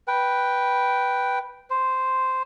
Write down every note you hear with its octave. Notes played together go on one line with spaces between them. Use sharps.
B4 G5
C5